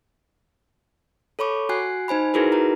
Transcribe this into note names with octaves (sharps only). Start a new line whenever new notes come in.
A4 C#5 B5 C#6 D6
F#4 G#5 F#6 C7
D#4 C5 G#5 B5
D#4 E4 F#4 G#4 A#4 B4
F#4 B4 A#5